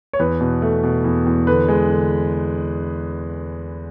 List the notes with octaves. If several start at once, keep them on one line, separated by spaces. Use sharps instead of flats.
C#5
E2 B4
B2
A3
B2
E2
E2
D3 B4
G#3
D3